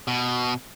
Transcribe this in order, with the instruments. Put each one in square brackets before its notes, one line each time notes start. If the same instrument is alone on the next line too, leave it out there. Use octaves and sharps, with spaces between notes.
[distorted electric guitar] B2